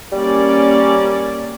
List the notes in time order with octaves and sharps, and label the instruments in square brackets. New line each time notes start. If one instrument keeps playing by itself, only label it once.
[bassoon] G3 [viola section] A#3 C#4 D5